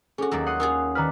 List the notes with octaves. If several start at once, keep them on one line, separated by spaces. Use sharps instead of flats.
C#4 F#4 G#4 A4
D#2 F#3 G#3 D#4 D5 E6
F#5 C6 D#6
C#4 F4 G#4 A#4
D#3 D4 B4 A#5 F6